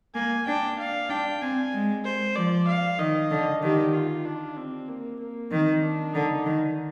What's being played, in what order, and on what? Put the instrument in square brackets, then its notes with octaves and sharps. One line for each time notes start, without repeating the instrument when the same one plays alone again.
[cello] A#3 [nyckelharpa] G#5
[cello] D4 [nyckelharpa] G5
[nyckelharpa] F5
[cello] D4 [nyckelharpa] G5
[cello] C4 [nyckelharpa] G#5
[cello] G#3
[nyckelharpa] C5
[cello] F3 [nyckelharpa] D5
[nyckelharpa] F5
[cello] D#3 [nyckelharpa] D#5
[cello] D3
[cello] D#3 [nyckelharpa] G4
[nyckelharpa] F4
D4
C4
A#3
A#3
[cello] D#3 [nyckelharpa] C4
[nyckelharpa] D4
[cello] D3 [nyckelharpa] D#4
[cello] D#3